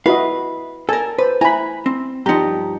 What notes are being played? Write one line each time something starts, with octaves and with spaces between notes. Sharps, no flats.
E4 F#4 B4 D#5 F5
A4 A#4 G#5 A5
B4 C5
E4 G#5 A#5 B5
C4
G2 F3 D#4 G4 A#5